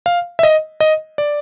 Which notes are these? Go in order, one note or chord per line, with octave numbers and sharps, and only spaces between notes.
F5
E5
D#5
D#5
D5